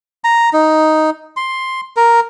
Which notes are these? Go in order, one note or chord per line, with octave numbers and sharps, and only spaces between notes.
A#5
D#4
C6
A#4